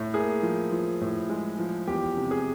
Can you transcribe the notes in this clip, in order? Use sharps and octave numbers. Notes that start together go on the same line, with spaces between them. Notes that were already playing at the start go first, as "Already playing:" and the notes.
Already playing: A2
A#3 G#4
F3
F3
A2
G#3
F3
E2 G4
C3
G#4